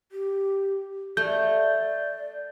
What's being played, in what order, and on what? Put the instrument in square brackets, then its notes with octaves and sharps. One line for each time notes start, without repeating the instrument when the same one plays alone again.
[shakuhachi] G4
[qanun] A3 [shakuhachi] D5 [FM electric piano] G6